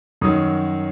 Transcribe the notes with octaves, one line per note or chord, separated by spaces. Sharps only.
F#2 D#3 F#3 D#6